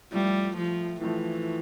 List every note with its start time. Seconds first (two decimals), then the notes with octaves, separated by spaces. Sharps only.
0.12 A2 F3 G3 A3
0.57 F3
1.01 A2 E3 F3 A3